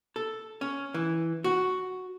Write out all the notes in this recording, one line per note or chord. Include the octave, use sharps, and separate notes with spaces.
A4
C#4
E3
F#4